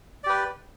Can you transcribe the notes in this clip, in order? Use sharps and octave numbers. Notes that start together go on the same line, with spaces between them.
G4 B4 D5